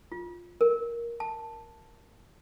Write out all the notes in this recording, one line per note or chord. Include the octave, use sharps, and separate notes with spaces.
F4
A#4
A5